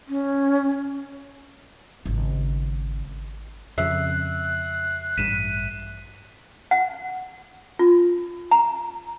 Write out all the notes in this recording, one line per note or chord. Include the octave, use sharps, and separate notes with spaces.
C#4
G#1 C#3
F2 C#3 E5 F#6 C7
A1 G2 B6 D#7 E7
F#5
F4
A#5